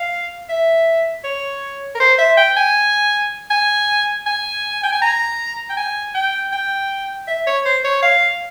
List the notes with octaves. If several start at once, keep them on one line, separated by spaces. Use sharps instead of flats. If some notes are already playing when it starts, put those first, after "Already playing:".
Already playing: F5
E5
C#5
A#4
C5
E5
G5
G#5
G#5
G#5
G5
G#5
A#5
G5
G#5
G5
G5
E5
C#5
C5
C#5
F5